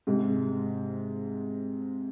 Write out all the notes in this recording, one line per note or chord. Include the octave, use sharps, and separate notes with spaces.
G#2 C3